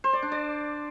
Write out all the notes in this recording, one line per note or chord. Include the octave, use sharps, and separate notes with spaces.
C5
D5
D4
D5